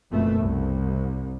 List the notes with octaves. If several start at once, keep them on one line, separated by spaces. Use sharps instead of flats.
F#1 F2 B2 A3
C2